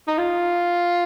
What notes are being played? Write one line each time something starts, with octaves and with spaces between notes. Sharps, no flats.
D#4
F4